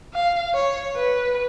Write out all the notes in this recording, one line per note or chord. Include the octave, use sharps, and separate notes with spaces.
F5
C#5
B4